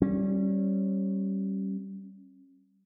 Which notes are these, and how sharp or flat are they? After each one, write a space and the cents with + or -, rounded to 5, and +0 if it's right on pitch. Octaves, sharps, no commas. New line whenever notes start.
G3 -20 C#4 -30